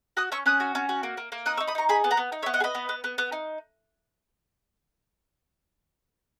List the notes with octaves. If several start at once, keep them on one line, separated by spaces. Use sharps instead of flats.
F#4 D#6 F#6
C#4 C#6 E6
C#4 D#6 F#6
F#4
C#4
F#4
A#3
A#3
A#3
D#4 D#6 F#6
C#6 E6
D#4
B5 D#6
D#4 A#5 C#6
G#4 G#5 B5
B3
F#5 A#5
B3
D#4
C#5 E5
B3
D#5 F#5
G#4
B4 D#5
B3
B3
B3
B3
D#4